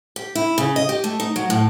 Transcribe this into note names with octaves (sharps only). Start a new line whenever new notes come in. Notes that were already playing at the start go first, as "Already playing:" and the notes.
G4
E4
C#3
D#5
G4
A3
D#4
F#3
A2